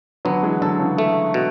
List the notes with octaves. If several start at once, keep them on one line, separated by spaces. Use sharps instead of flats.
D3 F#3 B3
E3 G#3
D3 F#3 A4
C#3 E3
A3
B2